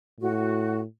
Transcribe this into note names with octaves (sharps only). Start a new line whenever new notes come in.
A2 F#4